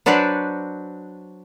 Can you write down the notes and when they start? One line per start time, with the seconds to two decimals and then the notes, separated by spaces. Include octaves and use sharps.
0.06 F#3 D4 F#4 B4 C5 D5